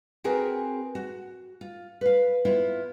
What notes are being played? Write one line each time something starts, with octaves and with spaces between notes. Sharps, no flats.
C4 F#4 G#4 A#4 B4
F#4
F4
B4 F5
B3 E4 F4